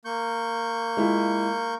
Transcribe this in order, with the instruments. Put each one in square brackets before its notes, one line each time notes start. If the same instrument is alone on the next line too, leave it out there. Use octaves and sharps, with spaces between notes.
[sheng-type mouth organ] A#3 C#6 G6
[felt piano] G#3 E4 F4